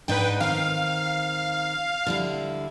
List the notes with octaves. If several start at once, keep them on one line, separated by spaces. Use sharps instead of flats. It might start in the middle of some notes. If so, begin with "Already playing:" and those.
G#2 D4 D#4 B4 G5
D#3 C4 F5
D3 G3 E4